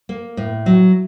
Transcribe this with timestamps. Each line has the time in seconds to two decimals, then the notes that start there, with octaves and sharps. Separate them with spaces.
0.09 A#3
0.37 A2
0.66 F#3